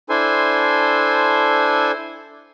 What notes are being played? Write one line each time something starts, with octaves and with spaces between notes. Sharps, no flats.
D4 E4 A4 C5 G#5 C6